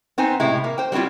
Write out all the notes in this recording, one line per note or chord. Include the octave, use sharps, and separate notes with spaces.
B3 C4 D#4 C5 G#5
A2 C3 G#3 E4
A#3
C5 G5
G3 B3 C4 E4 F4